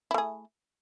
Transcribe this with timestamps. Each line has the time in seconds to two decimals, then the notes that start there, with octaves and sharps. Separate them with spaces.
0.11 E4
0.14 A3
0.18 G#4